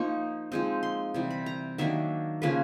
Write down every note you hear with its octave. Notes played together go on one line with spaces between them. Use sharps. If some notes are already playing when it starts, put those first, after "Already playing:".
Already playing: F3 A#3 D#4 C#6
F3 G#3 C4 D#4
C6
C3 E3 G3
B5
A#5
D#3 F#3 A#3 D4 E5
C#3 F3 A#3 C#4 B4